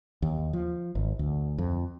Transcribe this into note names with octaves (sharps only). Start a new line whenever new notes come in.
D#2
F3
G#1
D2
F2